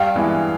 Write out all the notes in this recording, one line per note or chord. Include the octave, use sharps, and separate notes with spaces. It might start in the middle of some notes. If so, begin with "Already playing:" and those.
Already playing: G2 F5 G5
E3 G#3 B3 E4